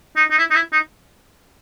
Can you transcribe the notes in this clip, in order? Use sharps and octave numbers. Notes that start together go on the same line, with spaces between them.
D#4
D#4
E4
D#4
E4
D#4